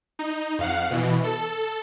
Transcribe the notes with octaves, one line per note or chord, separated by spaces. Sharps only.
D#4
F2 F5 F#5
B2 E3
A4